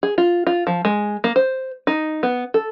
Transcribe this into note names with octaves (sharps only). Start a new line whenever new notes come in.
G#4
F4
F4
F3
G#3
A#3
C5
D#4
B3
A4